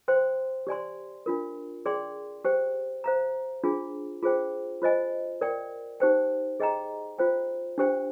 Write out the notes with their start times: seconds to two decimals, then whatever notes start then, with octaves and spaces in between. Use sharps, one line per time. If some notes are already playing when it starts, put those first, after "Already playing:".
0.08 C5 G5 C6
0.67 G4 D5 G#5 C6
1.26 D4 F4 A#4
1.86 G#4 D5 G5 C6
2.45 G4 C5 G5
3.04 C5 F5 A#5
3.64 D4 F4 G#4
4.22 F4 G#4 C5 G5
4.82 F4 C5 D#5 G#5
5.41 A#4 D5 G5
6.00 D#4 G4 C5 G5
6.60 G#4 D#5 G5 A#5
7.19 F4 C5 G5
7.78 D4 G4 C5 G5